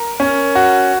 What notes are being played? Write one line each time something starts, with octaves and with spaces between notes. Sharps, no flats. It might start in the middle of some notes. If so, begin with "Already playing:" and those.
Already playing: A#4
C#4
F#4